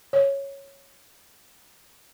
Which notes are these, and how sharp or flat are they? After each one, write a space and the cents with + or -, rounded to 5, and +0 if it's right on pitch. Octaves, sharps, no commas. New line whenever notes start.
C#5 -5